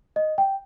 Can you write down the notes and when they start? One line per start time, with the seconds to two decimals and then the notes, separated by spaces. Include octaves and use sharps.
0.16 D#5
0.38 G5